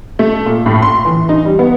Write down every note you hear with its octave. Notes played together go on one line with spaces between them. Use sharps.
A3
A#2
A2
C6
E3
D#4
G3
B3